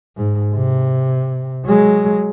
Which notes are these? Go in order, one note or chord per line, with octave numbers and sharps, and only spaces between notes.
G#2
C3
F#3 G#3